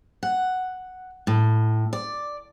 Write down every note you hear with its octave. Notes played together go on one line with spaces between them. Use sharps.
F#5
A2
D5